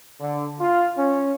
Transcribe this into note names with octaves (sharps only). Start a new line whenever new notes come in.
D3
F4
C#4